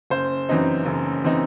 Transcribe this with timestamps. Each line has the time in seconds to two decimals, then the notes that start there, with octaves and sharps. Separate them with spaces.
0.10 F#1 C5
0.49 F#2 E3 C4 D#4
0.86 F#1
1.24 E3 C4 D#4